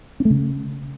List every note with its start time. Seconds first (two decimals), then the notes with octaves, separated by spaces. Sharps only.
0.20 C#4
0.25 A3
0.30 C#3